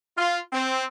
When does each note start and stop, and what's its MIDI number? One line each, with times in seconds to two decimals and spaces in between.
0.18 0.40 65
0.53 0.86 60